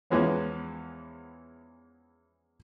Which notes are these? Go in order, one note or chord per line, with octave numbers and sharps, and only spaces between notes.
E2 E3 F3 G#3 B3 C#4